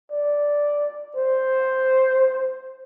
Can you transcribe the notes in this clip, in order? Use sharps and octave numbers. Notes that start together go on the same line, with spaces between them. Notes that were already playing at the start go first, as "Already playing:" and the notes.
D5
C5